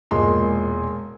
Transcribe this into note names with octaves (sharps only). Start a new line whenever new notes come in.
E1 A#2 G#3 C6